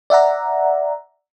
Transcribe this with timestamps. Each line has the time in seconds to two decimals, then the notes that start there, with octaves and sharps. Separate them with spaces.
0.10 D5 E5 F#5 A#5